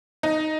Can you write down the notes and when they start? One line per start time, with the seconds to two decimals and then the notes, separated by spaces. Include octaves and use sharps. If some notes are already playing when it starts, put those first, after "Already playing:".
0.23 D#4